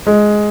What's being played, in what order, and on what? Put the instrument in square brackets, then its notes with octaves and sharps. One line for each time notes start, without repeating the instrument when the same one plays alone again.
[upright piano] G#3